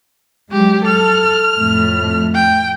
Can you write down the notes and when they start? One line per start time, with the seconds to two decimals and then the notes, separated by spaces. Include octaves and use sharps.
0.52 F#3 G#3 G4
0.86 A4 F6
1.57 F2 A2 A3
2.34 G5